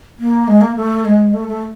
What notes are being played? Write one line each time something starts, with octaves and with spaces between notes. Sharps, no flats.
A#3
G#3
A#3
A3
G#3
A3
A3